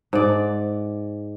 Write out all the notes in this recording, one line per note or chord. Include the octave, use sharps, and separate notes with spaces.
G#2 D5